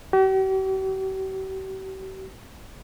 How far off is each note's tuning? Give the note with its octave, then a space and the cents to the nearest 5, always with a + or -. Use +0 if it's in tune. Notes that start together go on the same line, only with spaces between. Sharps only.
G4 -45